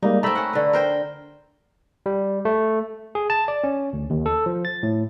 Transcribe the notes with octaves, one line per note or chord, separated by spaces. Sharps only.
G3 G#3 A#3 D#4
A3 C4 A#5 B5 E6
C#4 F#5
D3 B4
A#4 C5 G5
G3
A3
G#4
A5
D5
C#4
D2
D#2
A4
F3
A6
A2